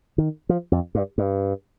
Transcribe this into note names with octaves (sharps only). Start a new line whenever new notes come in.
D#3
F3
F2
G2
G2